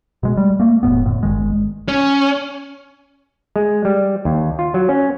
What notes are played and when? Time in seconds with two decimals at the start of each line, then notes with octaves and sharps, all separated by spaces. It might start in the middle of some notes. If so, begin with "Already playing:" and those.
0.23 B2 G#3
0.37 G3
0.60 A3 A#3
0.83 E1 A2 B3
1.05 F2 A2 D3
1.23 G1 E2 D#3 G#3
1.88 C#4
3.56 G#3
3.85 G3
4.25 D#2
4.59 F4
4.74 F#3
4.89 C#4